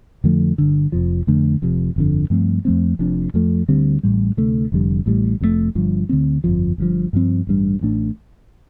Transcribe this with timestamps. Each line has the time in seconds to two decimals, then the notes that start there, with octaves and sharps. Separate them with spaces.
0.24 F2 D3 F3 A3
0.58 G1 G2 D3
0.92 F1 F2 F3
1.27 F2 D3 A3 D4
1.62 F1 F2 C3
1.96 G1 F2 D3
2.30 G2 F3 A3 C4
2.65 F2 F3 A3 C4
2.99 F1 F2 F3 D4
3.34 F2 F3 A3
3.68 D2 D3 G3 C4
4.03 A1 A2 G3
4.37 D2 C3 A3
4.72 F1 F2 D3 G3
5.06 A1 A2 G3
5.40 F1 F2 C3 A3
5.75 G1 G2 F3
6.09 D2 D3 A3 C4
6.44 G1 F2 F3
6.78 G1 G2 D3 F3
7.13 G2 F3 C4
7.47 A1 G2 G3
7.81 A1 A2 A3 D4